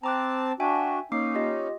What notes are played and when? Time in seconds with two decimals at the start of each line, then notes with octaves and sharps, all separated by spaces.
0.03 C4 A5 A#5 D6 F#6
0.60 D4 F#4 E5 G5 G#5
1.12 A#3 C#4 D#4 D6 C7
1.35 F4 G4 D#5